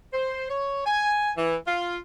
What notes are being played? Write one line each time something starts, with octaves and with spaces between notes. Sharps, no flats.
C5
C#5
G#5
E3
F4